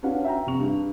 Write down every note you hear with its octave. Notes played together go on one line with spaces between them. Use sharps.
C#4 D4 F#4 B4 F5 F#5
E5 G5 A#5
F1 C3 C#6 F7
G2 D4 G#4